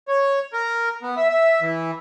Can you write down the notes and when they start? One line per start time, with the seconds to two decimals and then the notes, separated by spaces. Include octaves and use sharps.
0.08 C#5
0.53 A#4
1.03 B3
1.17 E5
1.30 E5
1.61 E3